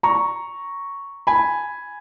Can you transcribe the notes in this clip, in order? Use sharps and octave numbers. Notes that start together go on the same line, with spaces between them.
A#5 C#6
G#5 B5